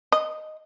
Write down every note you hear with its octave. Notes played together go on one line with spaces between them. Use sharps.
D#5